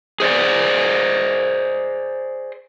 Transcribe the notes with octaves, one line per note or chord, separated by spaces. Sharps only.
G#4 C5 D5